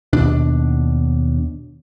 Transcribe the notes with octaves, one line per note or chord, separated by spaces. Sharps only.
D#2 B2 D4